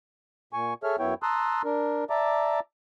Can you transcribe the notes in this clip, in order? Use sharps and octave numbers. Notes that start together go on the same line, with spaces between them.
A#2 G#5 C#6
G#4 A4 C#5 E5 F6
F#2 B3 E4 C#5 G5
A5 A#5 C6 D#6 E6 F#6
D4 A#4
D5 E5 A5 A#5 D6